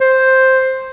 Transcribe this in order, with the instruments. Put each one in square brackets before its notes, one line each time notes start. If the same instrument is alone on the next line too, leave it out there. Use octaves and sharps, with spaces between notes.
[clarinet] C5